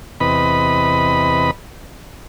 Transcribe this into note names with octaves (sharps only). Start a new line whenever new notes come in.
E2 C3 B4 D#5 B5